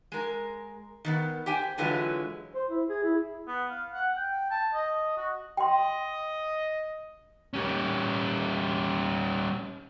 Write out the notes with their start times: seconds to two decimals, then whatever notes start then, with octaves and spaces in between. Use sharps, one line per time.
0.12 G#3 A#4
1.05 D#3 A#3 B3
1.46 G4 C5 G5 G#5
1.78 D3 E3 F#3 G#3 F4 B4
2.55 C5
2.69 E4
2.89 G#4
3.04 E4
3.47 B3
3.70 F5
3.93 F#5
4.16 G5
4.51 A5
4.74 D#5
5.17 F#4
5.57 D#5 G5 C6
7.53 G3 C#4